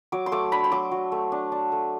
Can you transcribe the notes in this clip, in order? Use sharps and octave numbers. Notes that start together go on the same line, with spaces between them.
F#3 D6
C6
A3 D6
D4 B5
C6
F#3 D6
F#3
A3
D4
D4
A3